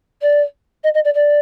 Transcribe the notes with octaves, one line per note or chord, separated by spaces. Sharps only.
D5
D#5
D#5
D5
D5